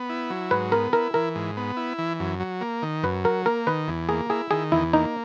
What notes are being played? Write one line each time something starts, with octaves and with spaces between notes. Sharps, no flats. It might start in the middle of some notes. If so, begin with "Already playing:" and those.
Already playing: B3
E4
F#3
G#2 B4
B3 A#4
E4 A#4
E3 A#4
G#2
B3
E4
E3
F#2
F#3
A#3
D#3
F#2 B4
F#3 A#4
A#3 A#4
D#3 B4
E2
A#3 G#4
E4 G#4
D#3 G#4
E2 E4
A#3 D#4